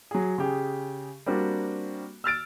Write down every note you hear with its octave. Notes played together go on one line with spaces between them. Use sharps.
F#3 G#4
C#3 G4 G#4
G3 A#3 C4 D4 F#4
E6 F6 A6 D7